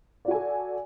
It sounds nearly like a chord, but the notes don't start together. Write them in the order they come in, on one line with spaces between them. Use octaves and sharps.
D5 F#4 G#5 A4